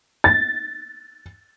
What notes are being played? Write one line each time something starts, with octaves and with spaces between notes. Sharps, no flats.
A6